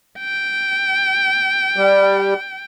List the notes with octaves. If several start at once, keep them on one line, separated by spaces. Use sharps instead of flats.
G5
G3